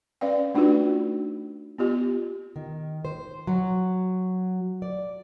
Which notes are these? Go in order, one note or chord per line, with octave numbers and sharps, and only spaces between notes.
C#4 B4 D5 F5 G5
A3 D4 D#4 F4 F#4 B4
B3 F4 G4
D#3
C5
F#3
D5